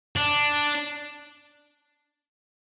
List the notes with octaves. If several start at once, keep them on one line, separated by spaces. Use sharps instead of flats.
D4